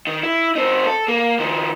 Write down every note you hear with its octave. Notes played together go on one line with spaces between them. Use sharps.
D#3
E4
C4 D#4
A4
A#3
D#3 F3